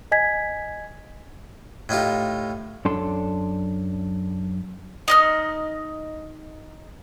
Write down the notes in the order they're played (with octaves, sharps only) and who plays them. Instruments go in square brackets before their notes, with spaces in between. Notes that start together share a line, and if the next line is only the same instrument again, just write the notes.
[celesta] D#5 G#5 G#6 B6
[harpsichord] A2 D#4 F4 G4
[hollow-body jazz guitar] F#2 D4 A4 C6
[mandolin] D#4 D#5 F6